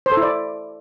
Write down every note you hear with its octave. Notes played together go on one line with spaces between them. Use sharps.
C5
A4
E4
D5